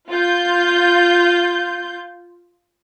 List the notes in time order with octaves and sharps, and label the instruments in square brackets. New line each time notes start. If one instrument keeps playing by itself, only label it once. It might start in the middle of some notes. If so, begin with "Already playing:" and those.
[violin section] F4 G6